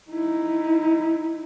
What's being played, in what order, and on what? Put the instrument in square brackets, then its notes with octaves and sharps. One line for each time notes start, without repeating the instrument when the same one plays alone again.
[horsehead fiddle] D#4 E4